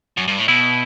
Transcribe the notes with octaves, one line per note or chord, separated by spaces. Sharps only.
F#2
G2
A2
B2 E4